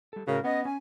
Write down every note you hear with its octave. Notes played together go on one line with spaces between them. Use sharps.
G3 A4
A2 C#3 F#4 A#4
B3 C#4 D#5
C#4 G#5